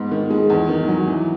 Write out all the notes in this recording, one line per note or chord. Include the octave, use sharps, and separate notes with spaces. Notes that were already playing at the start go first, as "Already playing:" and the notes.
Already playing: G#2 B3
D#3
G#3
E2
D#3
F#3
E3